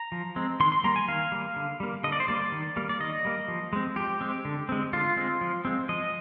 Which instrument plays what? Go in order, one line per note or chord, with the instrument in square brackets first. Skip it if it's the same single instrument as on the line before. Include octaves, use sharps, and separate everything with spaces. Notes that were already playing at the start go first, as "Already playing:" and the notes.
Already playing: [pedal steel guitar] A#5
F3
G#3 C4
D#3 C6
C6
G3 A#3 A#5
G#5
D#3 F5
G3 A#3
D3
G3 A#3
D3 D#5
D5
C5
G3 A#3 D5
D#3
G3 A#3
D5
D#3 D#5
G3 A#3
F3
G#3 C4
F3 G4
G#3 C4
D3
G#3 C4
D3 F4
G#3 C4
F3
G#3 C4
F3 D#5